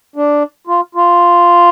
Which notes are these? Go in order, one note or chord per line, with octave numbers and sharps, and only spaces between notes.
D4
F4
F4